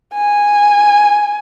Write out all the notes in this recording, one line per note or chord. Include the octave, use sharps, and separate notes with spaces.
G#5